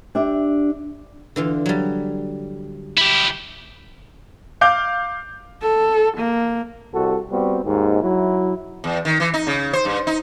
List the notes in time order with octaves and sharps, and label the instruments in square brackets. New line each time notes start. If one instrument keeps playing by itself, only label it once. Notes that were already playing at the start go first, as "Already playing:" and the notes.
[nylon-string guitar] D4 G4 E5
[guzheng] D3 E3 F4
F#3 G3
[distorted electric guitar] E4 G4
[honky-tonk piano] F5 D6 G6
[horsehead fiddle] A4
A#3
[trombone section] C2 F#4 G4 A4
G3 B3 C4 F#4
D#2 G#2
F#3 E4
[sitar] E2
D#3
E3
D#4
C#3
C5
G2
D#4